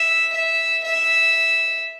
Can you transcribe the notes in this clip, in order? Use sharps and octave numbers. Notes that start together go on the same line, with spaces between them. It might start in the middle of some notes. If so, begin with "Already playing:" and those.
Already playing: E5
E5
E5